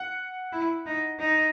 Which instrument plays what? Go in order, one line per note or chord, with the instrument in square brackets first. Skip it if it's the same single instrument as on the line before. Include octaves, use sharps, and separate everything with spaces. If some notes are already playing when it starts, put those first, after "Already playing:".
Already playing: [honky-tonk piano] F#5
[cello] E4
D#4
D#4